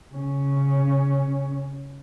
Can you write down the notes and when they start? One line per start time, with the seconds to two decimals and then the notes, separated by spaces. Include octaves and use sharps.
0.14 C#3 C#4